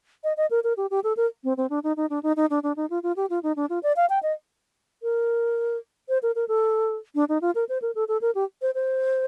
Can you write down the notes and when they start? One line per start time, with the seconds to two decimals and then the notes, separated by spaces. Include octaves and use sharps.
0.24 D#5
0.37 D#5
0.51 A#4
0.64 A#4
0.77 G4
0.91 G4
1.04 A4
1.17 A#4
1.44 C4
1.57 C4
1.70 D4
1.84 D#4
1.97 D#4
2.10 D4
2.23 D#4
2.37 D#4
2.50 D4
2.63 D4
2.77 D#4
2.90 F4
3.03 F4
3.17 G4
3.30 F4
3.43 D#4
3.56 D4
3.70 F4
3.83 D5
3.96 F5
4.10 G5
4.23 D#5
5.03 A#4
6.09 C5
6.23 A#4
6.35 A#4
6.48 A4
7.15 D4
7.29 D#4
7.42 F4
7.55 A#4
7.69 C5
7.82 A#4
7.95 A4
8.08 A4
8.21 A#4
8.35 G4
8.62 C5
8.75 C5